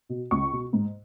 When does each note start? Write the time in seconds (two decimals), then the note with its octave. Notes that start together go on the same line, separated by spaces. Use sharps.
0.09 B2
0.31 C#2 C#6
0.52 B2
0.73 G#2